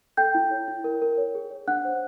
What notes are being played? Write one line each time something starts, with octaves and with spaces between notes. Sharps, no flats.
A4 G5 G6
E4
C#5
E4
A#4
A#4
C#5
G#4
C#5
D4 F#5 F#6
C5